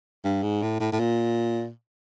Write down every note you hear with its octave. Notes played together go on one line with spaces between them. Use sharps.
G2
G#2
A2
A2
A2
A#2